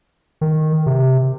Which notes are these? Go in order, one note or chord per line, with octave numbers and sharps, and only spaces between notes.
D#3
C3